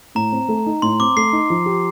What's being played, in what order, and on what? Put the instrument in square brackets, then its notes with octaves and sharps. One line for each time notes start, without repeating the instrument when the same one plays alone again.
[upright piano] A2 [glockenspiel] A#5
[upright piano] C4
A3
D#4
[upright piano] A2 [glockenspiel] C6
[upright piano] C4 [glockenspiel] D6
[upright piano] A3 [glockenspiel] C7
[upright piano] D#4
F3
G4